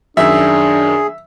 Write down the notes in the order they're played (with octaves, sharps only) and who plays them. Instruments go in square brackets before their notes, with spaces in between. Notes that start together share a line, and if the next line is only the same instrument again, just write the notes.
[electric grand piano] F#2 D#3 [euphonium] D4 [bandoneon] G#4 [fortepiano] E5